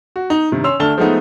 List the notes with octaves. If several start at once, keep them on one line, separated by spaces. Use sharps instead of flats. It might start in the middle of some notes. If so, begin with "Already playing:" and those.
F#4
D#4
G2 C3 D#3
C#4 C6 E6 F7
D2 A3 D4 A5 F6 G7
F3 G#3 A3 B3 D#4